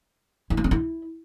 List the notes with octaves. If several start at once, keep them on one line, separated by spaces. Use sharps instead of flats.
E4
A#3
C4
E4